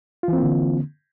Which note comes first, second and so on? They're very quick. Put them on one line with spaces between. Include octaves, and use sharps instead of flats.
F4 E3 C4 A#3 D3